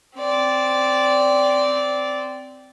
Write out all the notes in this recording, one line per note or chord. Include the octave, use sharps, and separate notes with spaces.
C4 D5